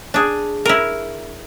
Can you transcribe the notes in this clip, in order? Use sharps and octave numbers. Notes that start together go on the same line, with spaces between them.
D4 G#4
E4 A#4